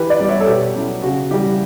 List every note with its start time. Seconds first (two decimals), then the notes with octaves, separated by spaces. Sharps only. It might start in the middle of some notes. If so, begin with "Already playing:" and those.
Already playing: E3 G4 B4
0.10 B4 D5
0.20 G3 B3
0.29 C#5 E5
0.41 A4
0.47 B2 G4
0.75 F#3 C#4 E4
1.03 C#3 F#4
1.31 E3 G3 G4